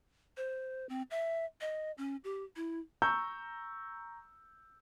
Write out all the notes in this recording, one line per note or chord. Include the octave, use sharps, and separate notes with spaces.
C5
C4
E5
D#5
C#4
G4
E4
A#5 C#6 E6 G6